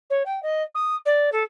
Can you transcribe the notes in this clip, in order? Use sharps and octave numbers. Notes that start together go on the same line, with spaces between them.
C#5
G5
D#5
D#6
D5
A4